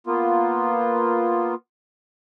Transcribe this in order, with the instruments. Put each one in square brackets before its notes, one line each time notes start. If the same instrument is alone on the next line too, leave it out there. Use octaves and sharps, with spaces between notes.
[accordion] A#3 B3 F4